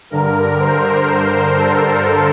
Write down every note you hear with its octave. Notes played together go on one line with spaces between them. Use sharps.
G2 D3 A#4
C5
A#4
A4